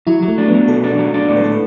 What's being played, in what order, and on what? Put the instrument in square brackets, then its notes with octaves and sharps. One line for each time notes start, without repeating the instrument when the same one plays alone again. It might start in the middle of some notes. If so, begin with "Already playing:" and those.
[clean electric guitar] F#3 [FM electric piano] E4
[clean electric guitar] F#3
[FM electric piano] A3
[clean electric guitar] D4
[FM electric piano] B3
[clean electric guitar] F#3
[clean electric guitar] B2 [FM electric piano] A4
[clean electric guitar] D4
F#3
D4
[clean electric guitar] A2 [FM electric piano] D5
[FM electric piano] B4
[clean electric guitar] A2 [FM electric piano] A4
[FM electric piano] B4